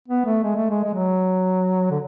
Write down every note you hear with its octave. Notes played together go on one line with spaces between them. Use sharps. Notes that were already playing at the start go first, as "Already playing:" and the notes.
B3
A3
G#3
A3
G#3
G#3
F#3
D3